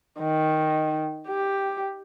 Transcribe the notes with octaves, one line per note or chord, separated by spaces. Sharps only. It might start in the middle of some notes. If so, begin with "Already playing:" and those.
D#3
G4